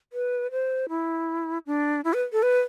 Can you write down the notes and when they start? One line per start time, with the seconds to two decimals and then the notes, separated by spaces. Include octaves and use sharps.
0.13 B4
0.51 C5
0.89 E4
1.66 D4
2.04 E4
2.14 B4
2.33 A4
2.43 B4